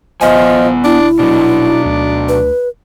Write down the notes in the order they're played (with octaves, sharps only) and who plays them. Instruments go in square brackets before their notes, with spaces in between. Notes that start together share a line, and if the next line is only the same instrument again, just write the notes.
[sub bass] D#1 [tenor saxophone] F3 [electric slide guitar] B3 G#5 [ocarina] D#5
[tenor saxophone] D4 [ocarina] E4
[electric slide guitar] B2 F#3 [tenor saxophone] D4
[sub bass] D2
[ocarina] B4